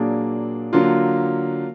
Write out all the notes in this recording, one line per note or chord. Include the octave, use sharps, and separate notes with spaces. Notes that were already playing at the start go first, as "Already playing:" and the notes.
Already playing: A#2 F#3 A#3 D4 G#4
D3 F#3 A#3 F4